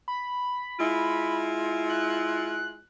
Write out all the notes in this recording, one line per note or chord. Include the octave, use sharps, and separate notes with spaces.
B5
G#3 E4 F4
F#6